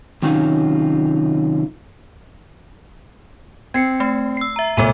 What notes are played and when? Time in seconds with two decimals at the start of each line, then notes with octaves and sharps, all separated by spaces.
0.22 C3 D#3 F#3 C#4 D#4 F4
3.74 C4 G#6 C7 C#7
4.00 A3
4.37 E6 C7
4.56 E5 A#5
4.77 C2 A#2 G#3 A4 D#7